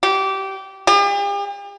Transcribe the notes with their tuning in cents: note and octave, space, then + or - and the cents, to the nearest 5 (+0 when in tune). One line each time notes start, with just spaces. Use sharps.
G4 -20
G4 +45